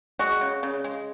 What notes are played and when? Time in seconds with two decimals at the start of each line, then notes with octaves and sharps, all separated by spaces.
0.19 G#3 F#4
0.41 C#3
0.63 C#3
0.84 G#3